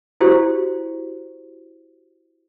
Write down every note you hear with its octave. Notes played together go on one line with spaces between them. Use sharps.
E4 F#4 G4 C5